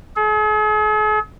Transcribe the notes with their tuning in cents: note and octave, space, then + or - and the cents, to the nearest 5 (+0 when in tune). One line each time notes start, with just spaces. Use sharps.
G#4 +45